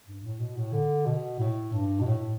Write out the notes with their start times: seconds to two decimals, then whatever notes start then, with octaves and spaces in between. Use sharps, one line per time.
0.07 G2
0.24 A2
0.40 B2
0.57 A2
0.73 D3
1.06 B2
1.39 A2
1.73 G2
2.00 B2
2.06 A2